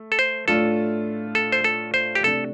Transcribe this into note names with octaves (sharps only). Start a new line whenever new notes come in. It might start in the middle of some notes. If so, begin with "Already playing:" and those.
Already playing: A3
A4
C5
A2 A3 D4 F4 A4
A4
C5
A4
C5
G4
C3 A3 D4 A4